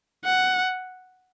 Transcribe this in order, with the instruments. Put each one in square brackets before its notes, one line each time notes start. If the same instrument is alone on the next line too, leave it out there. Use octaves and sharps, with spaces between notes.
[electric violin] F#5